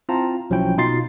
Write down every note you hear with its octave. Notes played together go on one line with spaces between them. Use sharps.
C4 E4 F4 A5 A#5
B1 F3 F#3 C#4 E4 G5
B2 D#4 F4 C6 A6 C7